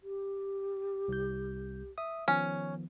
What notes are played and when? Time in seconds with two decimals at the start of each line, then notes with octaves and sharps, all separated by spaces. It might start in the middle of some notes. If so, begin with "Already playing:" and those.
0.03 G4
1.08 C2 G6
1.98 E5 D#6
2.28 D#3 F3 B3 C#4